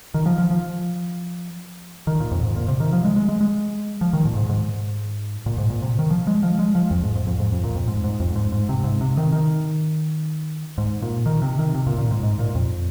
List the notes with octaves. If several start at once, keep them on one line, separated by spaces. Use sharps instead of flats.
D#3
F3
F3
F3
D#3
A#2
F2
G#2
A#2
C3
D#3
F3
G#3
G#3
G#3
G#3
F3
D#3
A#2
G#2
G#2
A#2
G#2
A#2
C3
D#3
F3
G#3
F3
G#3
F3
F2
G#2
G#2
F2
G#2
F2
A#2
F2
G#2
G#2
F2
G#2
G#2
C3
G#2
C3
D#3
D#3
G#2
A#2
D#3
C3
D#3
C3
A#2
A#2
G#2
G#2
A#2
F2